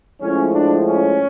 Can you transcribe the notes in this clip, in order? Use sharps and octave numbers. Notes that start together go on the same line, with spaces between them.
A2 F3 G#3 C#4
D4
C#4